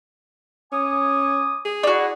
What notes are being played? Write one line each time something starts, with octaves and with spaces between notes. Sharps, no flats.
C#4 G#5 D6 D#6
G#4
D4 E4 F#4